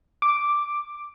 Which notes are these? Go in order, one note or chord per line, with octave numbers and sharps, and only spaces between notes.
D6